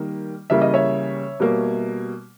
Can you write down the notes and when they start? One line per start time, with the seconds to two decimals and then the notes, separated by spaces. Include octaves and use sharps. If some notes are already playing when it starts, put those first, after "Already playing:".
Already playing: D#3 G3 A#3
0.50 C#3 E3 G3 A#3 E5
0.61 D#5
0.74 C#5 E5
1.40 B2 G3 A#3